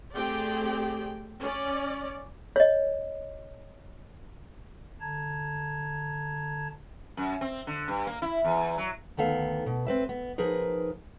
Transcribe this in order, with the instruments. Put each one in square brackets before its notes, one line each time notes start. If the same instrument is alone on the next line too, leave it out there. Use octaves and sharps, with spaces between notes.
[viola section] A3 C4 G4 G#4 D5 G5
C#4 D5
[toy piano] C#5 D#5
[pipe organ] D3 A5 A#5 G#6
[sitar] F#2
C4
D3
G2
A#3
E4
E2
F#3
[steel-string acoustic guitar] D2 D#3 B3 A4 F5
B2
C4 B4 E5
B3
F3 D#4 G#4 A#4 B4